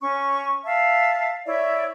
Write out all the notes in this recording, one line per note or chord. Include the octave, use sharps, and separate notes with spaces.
C#4 C#6
E5 F5 A5
E4 C#5 D5 E5